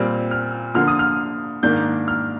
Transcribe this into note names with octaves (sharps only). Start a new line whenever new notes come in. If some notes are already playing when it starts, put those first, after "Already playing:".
Already playing: A#2 G3 C4 F6
F6
D3 F3 A#3 F6
D#6
F6
G#2 D#3 A#3 D4 G6
F6